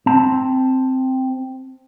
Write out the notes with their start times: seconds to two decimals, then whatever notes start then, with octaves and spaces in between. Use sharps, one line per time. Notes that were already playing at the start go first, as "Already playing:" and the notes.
0.06 C4 A5